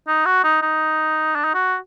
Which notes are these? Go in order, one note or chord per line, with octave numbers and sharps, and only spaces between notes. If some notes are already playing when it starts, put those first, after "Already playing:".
D#4
F#4
D#4
D#4
D4
D#4
F#4